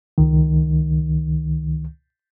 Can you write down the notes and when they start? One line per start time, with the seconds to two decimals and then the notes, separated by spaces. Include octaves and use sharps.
0.18 C#2 D#3